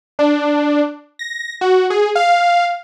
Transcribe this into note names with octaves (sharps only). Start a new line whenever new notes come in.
D4
A#6
F#4
G#4
F5